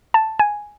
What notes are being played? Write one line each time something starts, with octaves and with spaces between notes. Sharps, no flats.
A5
G#5